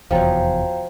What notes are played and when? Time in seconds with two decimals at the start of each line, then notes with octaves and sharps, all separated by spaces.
0.11 F1 E2 F3 F#3 F5 G5 A#5